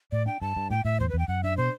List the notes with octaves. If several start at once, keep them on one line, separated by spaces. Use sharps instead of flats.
A2 D5
D4 G5
G2 A5
G2
A2 G5
A2 E5
E2 C5
B4
E2
G5
F#2 F#5
D4 E5
B2 C5